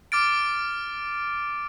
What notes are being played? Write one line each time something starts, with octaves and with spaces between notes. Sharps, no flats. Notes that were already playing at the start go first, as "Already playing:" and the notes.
D6 F6 A6 D7